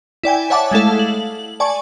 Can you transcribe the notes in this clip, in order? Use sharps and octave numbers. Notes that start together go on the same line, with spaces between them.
E4 D5 G5 G#5
C#5 E5 F#5 A5 D6
G#3 A3 E4 A4 F5
F#7
D5 G#5 A5 C#6